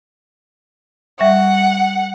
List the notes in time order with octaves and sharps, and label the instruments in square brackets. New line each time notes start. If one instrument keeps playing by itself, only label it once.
[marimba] G3 E5 C#6 [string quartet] F#5